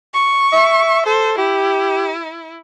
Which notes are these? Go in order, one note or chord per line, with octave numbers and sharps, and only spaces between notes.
C#6
E5
A4 C5
E4 G4